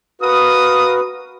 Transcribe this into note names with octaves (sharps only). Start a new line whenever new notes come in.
F#4 A#4 B4 F5 D#6